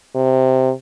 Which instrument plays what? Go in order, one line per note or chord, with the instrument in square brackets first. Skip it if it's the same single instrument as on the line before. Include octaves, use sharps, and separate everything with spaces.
[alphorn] C3